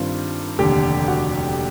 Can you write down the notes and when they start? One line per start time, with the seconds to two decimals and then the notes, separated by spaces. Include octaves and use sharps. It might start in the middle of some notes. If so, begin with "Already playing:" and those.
Already playing: G2 D#3 G3 C4 F4
0.59 F1 D#2 D3 G4 G5
1.08 F#4 F#5